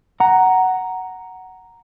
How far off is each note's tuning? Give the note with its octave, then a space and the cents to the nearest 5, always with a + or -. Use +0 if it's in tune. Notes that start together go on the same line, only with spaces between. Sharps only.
F#5 +10 A#5 +0